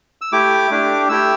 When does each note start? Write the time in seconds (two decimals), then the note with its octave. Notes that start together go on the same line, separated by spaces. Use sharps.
0.21 E6
0.32 A3 E4 G4 D6
0.71 A3 D4 G4
1.09 A3 E4 G4 E6